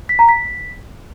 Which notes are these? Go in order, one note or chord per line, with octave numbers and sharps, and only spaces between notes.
B6
A#5
B6